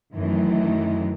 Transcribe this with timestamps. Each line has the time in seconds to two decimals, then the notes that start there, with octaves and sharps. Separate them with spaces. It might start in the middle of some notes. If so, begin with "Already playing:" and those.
0.14 F#2 D#3 E3 A3